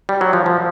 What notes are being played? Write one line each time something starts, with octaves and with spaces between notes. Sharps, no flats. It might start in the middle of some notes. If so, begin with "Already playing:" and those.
G3
F#3
F3
F3